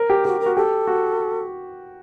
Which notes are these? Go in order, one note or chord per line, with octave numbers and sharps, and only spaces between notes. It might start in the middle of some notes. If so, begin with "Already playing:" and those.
Already playing: A#4
G4
F#4 G4
A#4
F#4
G4 A4
F#4